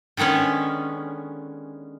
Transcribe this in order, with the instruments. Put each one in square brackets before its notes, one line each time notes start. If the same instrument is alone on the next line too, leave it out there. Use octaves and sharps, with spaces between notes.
[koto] D3 D#3 G#3 B3 C#4